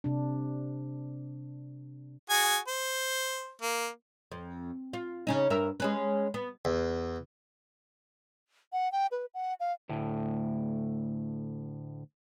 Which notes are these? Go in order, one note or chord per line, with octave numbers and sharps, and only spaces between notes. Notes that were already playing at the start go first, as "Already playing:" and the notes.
C3 D4
F#4 G#4 G#5
C5
A#3
F2
F4
C#3 C#4 D#4
G2 A#4 E5
G#3 C#4 B4
B3
E2
F#5
G5
B4
F#5
F5
D2 A2